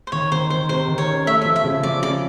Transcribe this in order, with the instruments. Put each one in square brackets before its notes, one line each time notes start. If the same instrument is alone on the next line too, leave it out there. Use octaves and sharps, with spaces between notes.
[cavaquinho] C5
[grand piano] D#3 [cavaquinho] C#5
[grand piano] D#3 [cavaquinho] C5
[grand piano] D#3 [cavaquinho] C5
[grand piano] C3 [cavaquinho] C5
[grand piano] D#3
[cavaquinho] C#5
[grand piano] C#4
[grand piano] A3 [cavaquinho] E5
[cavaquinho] E5
[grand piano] F3
[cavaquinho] E5
[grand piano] C#3
[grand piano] F3 [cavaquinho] D5
[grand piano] C#3 [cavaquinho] D5